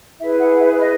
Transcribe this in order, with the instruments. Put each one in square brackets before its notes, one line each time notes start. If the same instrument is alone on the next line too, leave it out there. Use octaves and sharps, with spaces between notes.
[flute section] E4 G#4 B4 E5
F#5
E5
D#5